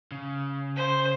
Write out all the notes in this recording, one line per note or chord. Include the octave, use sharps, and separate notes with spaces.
C#3
C5